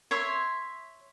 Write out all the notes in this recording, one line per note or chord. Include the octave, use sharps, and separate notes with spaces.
C#5 E5 C6